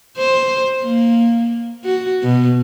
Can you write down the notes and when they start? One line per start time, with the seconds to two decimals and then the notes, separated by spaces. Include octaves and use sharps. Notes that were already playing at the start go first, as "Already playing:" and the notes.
0.17 C5
0.83 A#3
1.85 F#4
2.23 B2